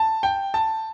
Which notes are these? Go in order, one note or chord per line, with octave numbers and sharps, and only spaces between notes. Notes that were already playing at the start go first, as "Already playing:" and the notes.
Already playing: A5
G5
A5